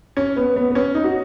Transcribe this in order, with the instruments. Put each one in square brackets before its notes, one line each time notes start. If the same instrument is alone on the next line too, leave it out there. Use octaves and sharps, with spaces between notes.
[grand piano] C#4
B3
B3
B3
C#4
D#4
F#4